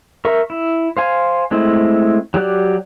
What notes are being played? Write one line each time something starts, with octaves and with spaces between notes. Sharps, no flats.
A#4 E5 C#6
E4
C5 F5 G#5
G#3 A3 C4 E4
F#3 G4 D5 F#6